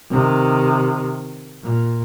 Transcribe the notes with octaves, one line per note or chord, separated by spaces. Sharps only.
C3 D#3
A#2